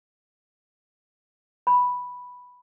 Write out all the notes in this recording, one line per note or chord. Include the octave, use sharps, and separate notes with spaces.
B5